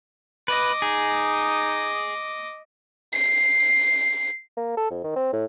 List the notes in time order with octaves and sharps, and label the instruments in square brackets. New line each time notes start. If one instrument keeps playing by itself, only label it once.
[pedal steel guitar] B4 [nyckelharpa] D#5 D6
[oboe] D#4 [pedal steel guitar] G#4
[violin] C7
[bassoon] A#3
A4
F2
D#3
C4
A2